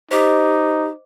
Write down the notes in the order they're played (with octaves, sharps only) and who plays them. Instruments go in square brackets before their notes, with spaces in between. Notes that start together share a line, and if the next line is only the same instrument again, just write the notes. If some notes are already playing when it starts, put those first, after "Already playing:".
[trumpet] D#4 [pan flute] G4 [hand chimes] C5 D#5 D6